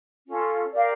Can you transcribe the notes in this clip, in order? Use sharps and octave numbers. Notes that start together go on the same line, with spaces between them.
C#4 F4 A4
G4 A#4 D5 F5